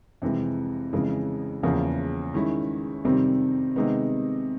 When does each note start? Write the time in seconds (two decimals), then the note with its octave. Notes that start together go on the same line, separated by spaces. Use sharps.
0.22 F2 C3 E3 G#3
0.93 F2 C#3 E3 G#3
1.63 E2 C#3 F3 A#3
2.34 D#3 G#3 C#4 E4
3.05 F2 C3 D#3 G3 C4
3.76 C3 D#3 G#3 B3 D#4